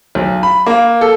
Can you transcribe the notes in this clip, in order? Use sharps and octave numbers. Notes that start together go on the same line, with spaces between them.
B1
B5
A#3
A4